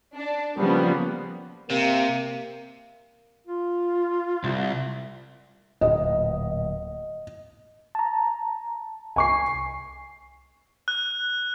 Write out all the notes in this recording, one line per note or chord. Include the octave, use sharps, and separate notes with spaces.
D4
C#3 F3 G3 A#3 B3
C3 A#3
F4
C2
D1 A#2 D#5
A5 A#5
C2 G#5 C#6 C7
F#6